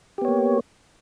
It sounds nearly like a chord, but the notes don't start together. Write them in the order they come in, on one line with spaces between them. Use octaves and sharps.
G4 B3 C#5 A#3